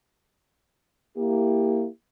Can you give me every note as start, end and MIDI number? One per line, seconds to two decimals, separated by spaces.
1.17 1.86 58
1.17 1.86 64
1.17 1.86 67